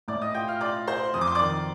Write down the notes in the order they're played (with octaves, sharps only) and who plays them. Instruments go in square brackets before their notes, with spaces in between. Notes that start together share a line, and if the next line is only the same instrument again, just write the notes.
[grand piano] A2 [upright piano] D5 D6
[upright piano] D#5 D#6
[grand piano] F4 [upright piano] G5 G6
[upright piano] F5 F6
[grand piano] F4 [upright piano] D5 D6
[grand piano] F4 [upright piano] C5 C6
[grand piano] F2 [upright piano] D#6
[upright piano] D6
C6
D5 D6
[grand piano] D#3